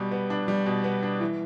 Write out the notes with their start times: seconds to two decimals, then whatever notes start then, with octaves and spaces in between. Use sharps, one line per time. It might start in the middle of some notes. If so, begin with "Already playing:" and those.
Already playing: B2 G3
0.11 B3
0.30 D4
0.48 G3
0.66 B2
0.84 B3
1.03 D4
1.20 E3